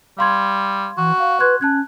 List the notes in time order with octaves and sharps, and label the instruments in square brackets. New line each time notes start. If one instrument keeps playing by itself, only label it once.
[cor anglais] G3 [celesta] F5 C6 G#6
[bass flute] E3 [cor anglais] F#4
[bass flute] F5
[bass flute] B4 [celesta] C6 F#6 G#6
[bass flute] C#4 [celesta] A5 F#6 G#6